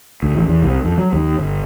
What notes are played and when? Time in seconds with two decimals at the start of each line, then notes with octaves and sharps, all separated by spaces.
0.23 D2
0.35 A1
0.47 E2
0.63 C2
0.85 F2
0.98 F#3
1.13 D#2
1.39 G1